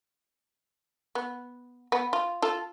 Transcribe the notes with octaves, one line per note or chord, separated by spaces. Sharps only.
B3
B3
F4
F4 A4